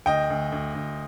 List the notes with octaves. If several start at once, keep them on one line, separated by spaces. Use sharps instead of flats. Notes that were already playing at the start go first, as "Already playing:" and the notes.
D2 D#5 G5
D2
D2
D2